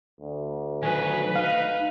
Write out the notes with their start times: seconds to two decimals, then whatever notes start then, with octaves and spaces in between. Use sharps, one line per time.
0.21 D2
0.83 D#3 F#3 B4 G#5
1.36 D#4 F5